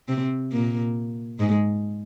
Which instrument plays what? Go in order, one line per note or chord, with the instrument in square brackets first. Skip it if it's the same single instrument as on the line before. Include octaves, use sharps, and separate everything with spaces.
[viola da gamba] C3 C4
A#2 A#3
G#2 G#3